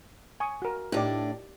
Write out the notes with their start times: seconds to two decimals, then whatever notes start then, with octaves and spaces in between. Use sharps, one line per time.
0.40 G#5 C#6 D#6
0.62 F#4 A#4
0.92 A2 D4 D#4 G4 D5